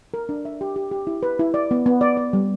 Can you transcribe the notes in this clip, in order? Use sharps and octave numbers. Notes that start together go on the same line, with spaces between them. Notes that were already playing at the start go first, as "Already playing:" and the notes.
A#4
D4
E5
G4
G4
G4
E4
B4
E4
D5
B3
B3
D5
D5
G3